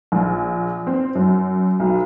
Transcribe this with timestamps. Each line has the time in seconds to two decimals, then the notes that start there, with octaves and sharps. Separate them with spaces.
0.12 A#1
0.87 C4
1.15 F#2
1.80 B1